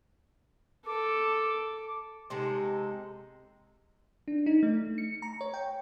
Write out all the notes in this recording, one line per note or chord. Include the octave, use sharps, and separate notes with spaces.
A4 D6
C3 G#3 D#4 A4
D4
D#4
A3
C#7
A#5
C#5
G5